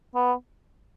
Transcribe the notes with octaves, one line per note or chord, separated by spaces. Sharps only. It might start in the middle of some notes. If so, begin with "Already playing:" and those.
B3